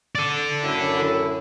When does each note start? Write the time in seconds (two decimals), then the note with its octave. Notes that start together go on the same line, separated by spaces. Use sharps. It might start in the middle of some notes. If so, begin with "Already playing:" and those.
0.15 A4 D5
0.63 F#2 A2 E4